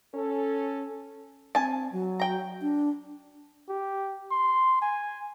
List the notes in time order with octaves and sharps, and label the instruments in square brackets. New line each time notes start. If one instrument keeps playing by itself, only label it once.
[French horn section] C#4 A4
[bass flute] C4 [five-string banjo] G#5 A5
[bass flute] F#3
[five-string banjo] G5 A#5
[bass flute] D4
[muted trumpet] G4
C6
G#5